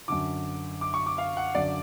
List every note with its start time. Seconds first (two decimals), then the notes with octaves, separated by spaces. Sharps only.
0.08 F#2 D3 D6
0.81 D6
0.94 C#6
1.06 D6
1.18 F5
1.37 F#5
1.55 F#2 D3 D5